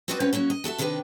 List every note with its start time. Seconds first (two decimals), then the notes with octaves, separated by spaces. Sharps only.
0.08 C4 F#4 B4 C5 D5 D#5
0.20 C4 C#4 F4 F#4 B4 C#5
0.33 F#3 A#3 C#4 F#4
0.50 D#5
0.64 F#4 A4 D#5 E5
0.78 C3 D#3 D4 G4 B4 G5